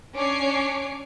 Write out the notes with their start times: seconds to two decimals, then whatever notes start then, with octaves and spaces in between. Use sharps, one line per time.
0.14 C#4 D4 C#5 D6 C7